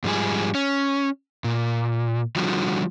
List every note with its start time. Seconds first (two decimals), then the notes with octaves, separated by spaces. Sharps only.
0.04 G#2 F3 G3 G#4
0.55 C#4
1.44 A#2
2.36 D3 F3 G3 F4 F#4